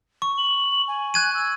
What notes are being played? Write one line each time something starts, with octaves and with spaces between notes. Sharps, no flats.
C#6
F#7
G#5
F#6 G#6 D#7
E6